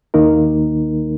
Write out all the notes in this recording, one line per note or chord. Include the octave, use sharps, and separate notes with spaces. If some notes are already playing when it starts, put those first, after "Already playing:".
D#2 D#3 A#3 D#4 A#4